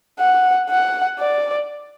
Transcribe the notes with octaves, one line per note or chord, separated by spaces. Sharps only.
F#5
F#5
D5